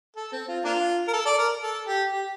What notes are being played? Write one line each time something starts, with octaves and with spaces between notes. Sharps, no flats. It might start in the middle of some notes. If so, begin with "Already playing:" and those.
A4
C4
F4
A#3 D4 F4
A#4
A4
D5
A#4
A4
G4
G4